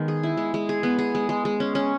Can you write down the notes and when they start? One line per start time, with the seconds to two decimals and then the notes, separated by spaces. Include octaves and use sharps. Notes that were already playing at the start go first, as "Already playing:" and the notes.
Already playing: D#3 G#3 B3
0.08 G#4
0.23 E4
0.37 G#3
0.54 G#3
0.69 G#4
0.83 B3
0.98 G#4
1.15 G#3
1.29 G#3
1.45 G#3
1.60 C#4
1.75 C#4